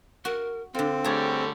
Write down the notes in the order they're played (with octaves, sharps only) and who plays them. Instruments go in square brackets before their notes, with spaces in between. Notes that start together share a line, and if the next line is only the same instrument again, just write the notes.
[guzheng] F#4 [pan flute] A#4
[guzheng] D3 F4 [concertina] C4 [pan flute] A4
[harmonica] D3 G3 C#5 [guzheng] A3 G#4